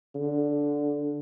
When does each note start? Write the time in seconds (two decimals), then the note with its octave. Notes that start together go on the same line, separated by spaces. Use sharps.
0.15 D3